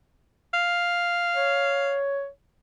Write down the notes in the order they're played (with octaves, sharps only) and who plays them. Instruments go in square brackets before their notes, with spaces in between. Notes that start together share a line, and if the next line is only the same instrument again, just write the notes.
[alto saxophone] F5
[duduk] C#5